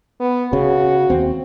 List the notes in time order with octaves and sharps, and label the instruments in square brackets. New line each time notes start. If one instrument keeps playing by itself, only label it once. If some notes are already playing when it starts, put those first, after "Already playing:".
[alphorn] B3
[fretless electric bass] C#3 [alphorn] F#4
[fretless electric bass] D#2 C4